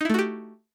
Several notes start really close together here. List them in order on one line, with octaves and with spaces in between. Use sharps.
D#4 E4 A3 F#4 G4